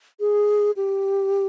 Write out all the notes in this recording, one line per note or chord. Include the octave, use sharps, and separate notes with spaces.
G#4
G4